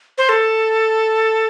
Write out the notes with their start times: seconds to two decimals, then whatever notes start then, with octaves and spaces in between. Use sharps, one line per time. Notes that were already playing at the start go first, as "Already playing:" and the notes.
0.18 C5
0.29 A4